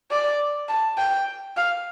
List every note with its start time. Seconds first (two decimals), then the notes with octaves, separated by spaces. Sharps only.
0.11 D5
0.68 A5
0.98 G5
1.57 F5